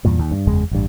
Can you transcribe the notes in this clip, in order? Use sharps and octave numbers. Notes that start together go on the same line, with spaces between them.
E2 G2 A#2
D#2
G2
F#1 E2 C#3 G#3
A1 G2